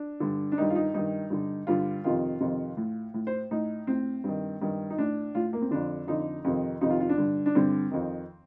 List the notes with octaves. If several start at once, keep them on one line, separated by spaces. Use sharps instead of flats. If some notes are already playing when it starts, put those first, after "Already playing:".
Already playing: D4
G2 D3
D4
G2 D#3 D#4
F4
D#4
G2 D#3 D#4
G2 D3
G2 D3 F4
F2 C3 D#3 F4
F2 C3 D#3
A2
A2
C5
A2 D#4
A2 C4
G2 D#3
G2 D#3
D#4
A2 D4
A2 F4
A#3
C4
F2 D3 D4
F2 D3 D#4
F2 C3 D#3
F2 C3 D#3 D#4
F4
F4
D4
G2 D3
D4
G2 D3 C4
F2 D#3